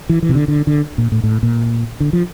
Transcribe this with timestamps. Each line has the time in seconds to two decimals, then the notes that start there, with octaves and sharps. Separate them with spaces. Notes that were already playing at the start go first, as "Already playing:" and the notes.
0.09 E3
0.22 E3
0.29 C3
0.35 D3
0.48 D3
0.67 D3
0.98 A#2
1.12 A2
1.23 A2
1.43 A#2
2.00 D3
2.13 F3